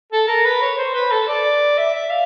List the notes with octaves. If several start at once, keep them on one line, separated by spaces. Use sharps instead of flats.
A4
A#4
B4
C#5
C5
B4
A4
D5
E5
E5
F5